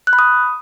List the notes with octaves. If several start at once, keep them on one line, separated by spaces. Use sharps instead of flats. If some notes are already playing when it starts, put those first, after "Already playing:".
F#6
B5
D#6